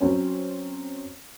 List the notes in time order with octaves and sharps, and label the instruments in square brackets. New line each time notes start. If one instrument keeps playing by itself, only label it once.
[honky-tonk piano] F#3 C4 C#4